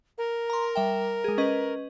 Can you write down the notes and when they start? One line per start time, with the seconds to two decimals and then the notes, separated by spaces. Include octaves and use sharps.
0.18 A#4
0.50 A#5 C6
0.75 G3 E5 G5
1.24 G#3 G#4
1.38 C#4 B4 D#5